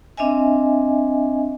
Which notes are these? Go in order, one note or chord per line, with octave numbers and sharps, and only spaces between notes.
C4 D4 D#5 E5 G#5